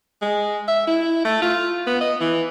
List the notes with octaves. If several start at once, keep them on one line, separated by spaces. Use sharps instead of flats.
G#3
E5
E4
A3
F4
B3
D#5
E3